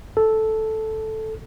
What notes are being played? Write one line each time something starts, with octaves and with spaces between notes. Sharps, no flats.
A4